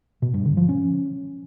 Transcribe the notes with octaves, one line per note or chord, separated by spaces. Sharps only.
B2
G2
D3
F3
C#4